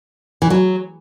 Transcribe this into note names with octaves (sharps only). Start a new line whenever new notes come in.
E3
F#3